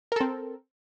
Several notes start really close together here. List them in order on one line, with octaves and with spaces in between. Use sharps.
A#4 A4 C4